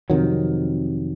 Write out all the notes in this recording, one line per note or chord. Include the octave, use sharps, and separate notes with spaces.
F2 C3 D#3 F#3